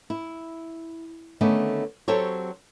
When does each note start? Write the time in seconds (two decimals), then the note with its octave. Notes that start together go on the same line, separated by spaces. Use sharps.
0.10 E4
1.41 D3 D#3 A3 B3 C#4
2.08 F#3 C4 G4 A4 C5 C#5